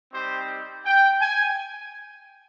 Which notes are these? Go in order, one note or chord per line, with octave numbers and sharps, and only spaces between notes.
G3 C4 D#4 G4 C5
G5
G#5